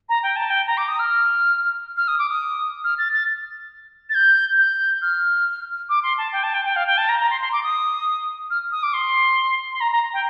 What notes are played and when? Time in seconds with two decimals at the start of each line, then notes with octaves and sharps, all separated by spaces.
0.09 A#5
0.23 G5
0.36 A5
0.50 G5
0.67 A#5
0.77 D6
0.88 D#6
0.99 F6
1.97 F6
2.08 D#6
2.19 D6
2.29 D#6
2.84 F6
2.98 A6
3.13 A6
4.10 A6
4.15 G6
4.59 G6
5.02 F6
5.89 D6
6.03 C6
6.18 A5
6.33 G5
6.43 A5
6.54 G5
6.65 G5
6.76 F5
6.87 G5
6.98 A5
7.09 A#5
7.19 A#5
7.31 C6
7.41 C6
7.52 D6
7.63 D#6
8.51 F6
8.72 D#6
8.83 D6
8.93 C6
9.72 C6
9.81 A#5
9.92 A#5
10.14 G5